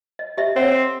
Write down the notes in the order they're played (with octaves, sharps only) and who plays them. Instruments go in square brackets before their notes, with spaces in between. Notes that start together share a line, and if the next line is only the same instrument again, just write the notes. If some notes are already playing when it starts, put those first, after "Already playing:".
[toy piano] D#5
G4 D#5 E5
[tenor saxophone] C4 [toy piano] C#5 F#5